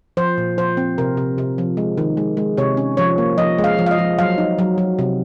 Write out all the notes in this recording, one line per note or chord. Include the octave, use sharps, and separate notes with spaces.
F3 C5
A#2
F3 C5
C4
C3 A#4
C3
C3
F3
G#3
D#3
G#3
G#3
C3 C#5
C#4
F3 C#5
A#3
F3 D#5
G#3
F5
F3
F5
D#5
F3
F#3 F5
D#4
F#3
F#3
C3